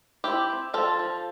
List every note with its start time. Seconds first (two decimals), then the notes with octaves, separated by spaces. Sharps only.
0.24 C4 E4 G4
0.49 C4
0.74 F3 F4 A4
0.99 F3